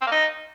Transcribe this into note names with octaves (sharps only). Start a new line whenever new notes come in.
C4
A#3
D#4